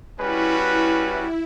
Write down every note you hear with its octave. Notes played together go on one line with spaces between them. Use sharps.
G3 C#4 E4 F#4 B4
E4